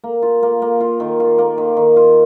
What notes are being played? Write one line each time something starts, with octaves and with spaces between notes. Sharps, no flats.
A#3
F4
A#3
A#3
F4
D#3
F4
A#3
D#3
D#3
F4